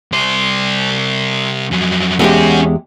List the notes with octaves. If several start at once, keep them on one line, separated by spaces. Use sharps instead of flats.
C2 C5
F2 F#3
E2 G#3 C#4 F#4 G4